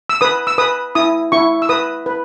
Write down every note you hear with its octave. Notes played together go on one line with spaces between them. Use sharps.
E6
B4 D#6
E6
B4 D#6
E4 D#6
E4 C#6
E6
B4 D#6
B4